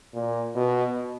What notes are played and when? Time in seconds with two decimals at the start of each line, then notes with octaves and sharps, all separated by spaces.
0.14 A#2
0.55 B2